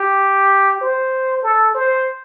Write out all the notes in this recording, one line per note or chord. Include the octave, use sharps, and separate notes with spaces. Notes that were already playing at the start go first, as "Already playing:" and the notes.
Already playing: G4
C5
A4
C5